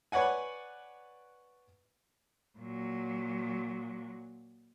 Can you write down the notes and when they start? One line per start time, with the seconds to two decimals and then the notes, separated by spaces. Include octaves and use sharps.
0.12 B4 C#5 D5 F#5 G#5
2.58 A#2 F#3